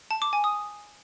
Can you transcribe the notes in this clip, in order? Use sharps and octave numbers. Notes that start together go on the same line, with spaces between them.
A5
D6
G#5
D#6